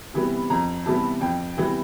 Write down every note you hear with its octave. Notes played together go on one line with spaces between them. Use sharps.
C3 E3 G3 B3
F2 A#5
C3 E3 G3 B3 A5
F2 G5
C3 E3 G3 B3